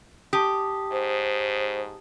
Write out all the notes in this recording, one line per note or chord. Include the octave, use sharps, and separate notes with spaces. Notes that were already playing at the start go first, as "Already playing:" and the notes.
G4 A5 D#6
G#2 C5